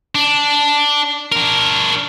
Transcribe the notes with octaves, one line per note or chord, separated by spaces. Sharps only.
D4
D4 A#4